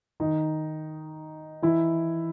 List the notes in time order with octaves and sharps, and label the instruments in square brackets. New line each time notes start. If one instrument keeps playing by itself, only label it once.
[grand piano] D#3 D#4
E3 E4